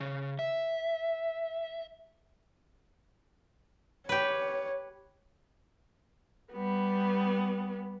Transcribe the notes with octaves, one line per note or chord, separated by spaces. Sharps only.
C#3
E5
G4 B4 C#5
G3 B3